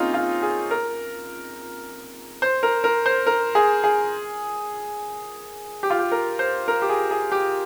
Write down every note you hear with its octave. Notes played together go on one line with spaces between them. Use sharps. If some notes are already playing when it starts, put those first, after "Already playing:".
Already playing: A#3 C4 C#4 D#4 F4 G#4
F4
G#4
A#4
C5
A#4
A#4
C5
A#4
G#4
G#4
G4
F4
G4
A#4
C5
A#4
G4
G#4
G#4
G4